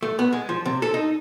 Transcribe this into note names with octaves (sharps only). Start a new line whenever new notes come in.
A3
B3
G#3
F3
C3
A4
D#4